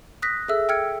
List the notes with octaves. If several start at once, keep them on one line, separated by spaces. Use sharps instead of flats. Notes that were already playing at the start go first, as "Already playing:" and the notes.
D#6 F#6 A#6 B6
G#4 A4 E5 E6
G5 E6 F6 G#6 C#7